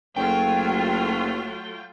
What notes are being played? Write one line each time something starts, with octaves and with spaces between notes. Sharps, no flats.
F#1 F#3 A3 F4 G5